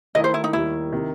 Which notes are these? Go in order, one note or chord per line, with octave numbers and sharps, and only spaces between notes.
D#3 A3 E4 D#5
C5
E4
D#4
D#2 D#3 G3 E4
C3 D#3